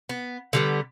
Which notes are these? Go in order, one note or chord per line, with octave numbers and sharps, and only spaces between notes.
B3
D3 G3 B3